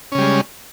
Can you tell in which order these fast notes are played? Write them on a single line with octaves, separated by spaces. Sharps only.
C#4 C#3 G3 G#3